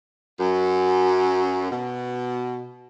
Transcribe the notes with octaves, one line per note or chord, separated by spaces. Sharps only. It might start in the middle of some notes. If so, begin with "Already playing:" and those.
F#2
B2